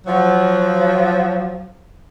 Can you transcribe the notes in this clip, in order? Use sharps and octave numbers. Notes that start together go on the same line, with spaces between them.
F3 F#3